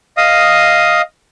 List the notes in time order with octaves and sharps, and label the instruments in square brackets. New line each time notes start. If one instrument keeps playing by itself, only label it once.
[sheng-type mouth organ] D#5 F5 D#6